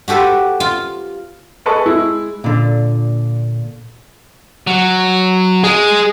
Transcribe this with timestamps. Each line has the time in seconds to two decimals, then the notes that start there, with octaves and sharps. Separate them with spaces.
0.08 F#4 G4 A4 B4 C5
0.60 F4
1.66 G#4 A4 B4 D#5 A5 C#6
1.86 G#3 E4
2.44 A#2 D3
4.67 F#3
5.64 G#3 G#4